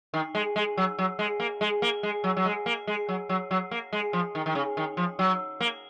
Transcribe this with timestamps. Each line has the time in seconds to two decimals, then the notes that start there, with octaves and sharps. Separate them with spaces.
0.14 D#3
0.35 G#3
0.56 G#3
0.77 F#3
0.99 F#3
1.19 G#3
1.40 A#3
1.61 G#3
1.82 A#3
2.03 G#3
2.24 F#3
2.37 F#3
2.45 G#3
2.66 A#3
2.87 G#3
3.09 F#3
3.29 F#3
3.51 F#3
3.71 A#3
3.93 G#3
4.13 F3
4.35 D#3
4.46 D#3
4.55 C#3
4.77 D#3
4.97 F3
5.19 F#3
5.61 A#3